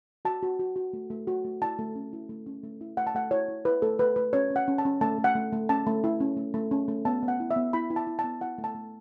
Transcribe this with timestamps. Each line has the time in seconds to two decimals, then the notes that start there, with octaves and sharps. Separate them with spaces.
0.25 F#4 A5
0.43 F#4
0.59 F#4
0.76 F#4
0.93 A3
1.10 A3
1.27 F#4
1.45 A3
1.62 E4 A5
1.79 A3
1.96 C#4
2.13 E4
2.29 A3
2.46 C#4
2.64 A3
2.81 E4
2.97 A3 F#5
3.07 A5
3.15 A3 F#5
3.31 E4 C#5
3.48 E4
3.65 E4 B4
3.82 A3 A4
3.99 A3 B4
4.16 A3 B4
4.33 C#4 C#5
4.50 C#4
4.56 F#5
4.68 C#4
4.78 A5
4.85 C#4
5.01 A3 A5
5.18 A3
5.24 F#5
5.35 A3
5.53 A3
5.69 C#4 A5
5.87 A3
6.04 E4
6.20 C#4
6.37 A3
6.54 A3
6.71 C#4
6.88 A3
7.05 B3 A5
7.23 B3
7.28 F#5
7.40 E4
7.51 E5
7.56 B3
7.73 E4 B5
7.90 E4
7.96 A5
8.07 E4
8.19 A5
8.24 B3
8.41 E4 F#5
8.58 A3
8.64 A5
8.75 A3